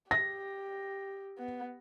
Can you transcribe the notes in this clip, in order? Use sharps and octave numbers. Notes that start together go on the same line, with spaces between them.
G4 A#6
B3